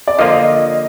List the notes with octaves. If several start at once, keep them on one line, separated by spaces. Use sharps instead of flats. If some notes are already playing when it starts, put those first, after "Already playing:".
D5
D3 F3 A#3 F4 D#5